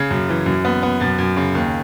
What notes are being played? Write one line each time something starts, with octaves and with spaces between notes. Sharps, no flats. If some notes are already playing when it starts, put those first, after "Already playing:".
Already playing: C#3 G#6
F#2
E3
F#2
B3
B3
F#2 A6
F#2
C#3
D#2